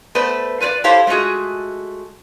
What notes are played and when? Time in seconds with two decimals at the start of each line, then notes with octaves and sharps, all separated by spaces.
0.15 A3 B3 B4 C5 D5
0.60 F4 B4 C#5 D5
0.84 E4 G4 A4 C5 C#5 F5
1.07 G#3 A3 F4 F#4 G#4